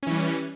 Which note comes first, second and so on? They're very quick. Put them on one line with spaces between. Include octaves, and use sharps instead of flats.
C#4 E3 G3